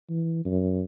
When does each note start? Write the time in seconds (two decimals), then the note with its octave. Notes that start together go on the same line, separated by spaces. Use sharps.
0.10 E3
0.45 F#2